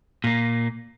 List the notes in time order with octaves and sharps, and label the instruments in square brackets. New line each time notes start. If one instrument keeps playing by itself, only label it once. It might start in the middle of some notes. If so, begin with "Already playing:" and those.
[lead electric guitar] A#2 A#3